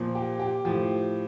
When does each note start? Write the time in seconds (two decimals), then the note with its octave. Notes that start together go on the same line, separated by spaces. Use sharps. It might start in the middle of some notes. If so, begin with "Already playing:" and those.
Already playing: A#2 F3
0.15 G4
0.40 G4
0.65 A2 F3 G4